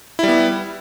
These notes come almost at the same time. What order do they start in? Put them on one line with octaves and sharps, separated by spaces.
E4 G3 B3